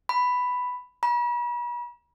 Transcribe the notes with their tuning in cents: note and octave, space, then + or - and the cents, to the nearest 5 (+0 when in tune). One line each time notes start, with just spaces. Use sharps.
B5 +5
B5 -40